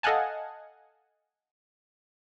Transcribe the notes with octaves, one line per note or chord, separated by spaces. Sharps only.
A4 D#5 F5 F#5 G#5 A5